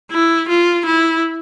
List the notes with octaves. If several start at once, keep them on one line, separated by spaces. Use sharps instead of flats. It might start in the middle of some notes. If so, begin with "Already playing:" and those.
E4
F4
E4